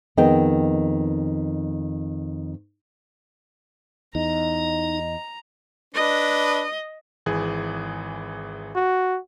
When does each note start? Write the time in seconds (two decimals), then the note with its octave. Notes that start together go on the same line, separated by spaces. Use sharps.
0.17 F2 D#3 B3 G#4 D#5 G5
4.15 E2 D#4 D#5 A#5
5.94 D4 B4 D#5
7.26 G#1 E3 G#4
8.76 F#4